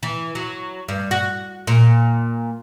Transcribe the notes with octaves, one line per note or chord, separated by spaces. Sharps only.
E3
F#3
G2
F#4
A#2